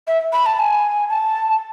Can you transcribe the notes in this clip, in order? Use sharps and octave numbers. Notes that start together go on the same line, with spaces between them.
E5
B5
A5
G#5
A5